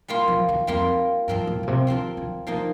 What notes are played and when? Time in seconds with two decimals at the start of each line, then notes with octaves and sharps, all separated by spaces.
0.08 G3 A#3 F4
0.28 F3
0.49 D#3
0.67 F2 G3 A#3 F4
1.28 G2 F3 C4 F4 A#4
1.47 A2
1.63 A#2
1.67 C3
1.87 D3 F3 C4 F4 A#4
2.17 D3
2.47 D3 F3 A#3 D#4